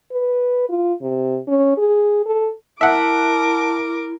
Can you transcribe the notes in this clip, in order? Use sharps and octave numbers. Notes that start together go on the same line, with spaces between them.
B4
F4
C3
C#4
G#4
A4
E4 A#4 E5 F#5 A5 D6